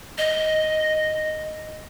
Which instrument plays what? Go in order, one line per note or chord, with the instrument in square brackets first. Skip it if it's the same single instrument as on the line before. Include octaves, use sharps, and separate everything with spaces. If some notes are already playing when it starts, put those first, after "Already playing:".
[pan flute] D#5